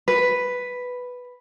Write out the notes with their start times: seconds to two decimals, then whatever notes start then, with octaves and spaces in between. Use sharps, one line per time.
0.08 B4